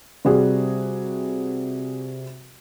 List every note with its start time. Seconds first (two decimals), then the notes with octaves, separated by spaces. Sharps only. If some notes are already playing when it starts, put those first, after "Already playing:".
0.25 C3 G3 F#4 G#4